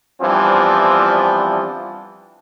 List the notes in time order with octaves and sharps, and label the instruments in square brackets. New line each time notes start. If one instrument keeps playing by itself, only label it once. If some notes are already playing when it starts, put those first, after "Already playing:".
[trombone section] E3 F3 G3 B3 C4 D4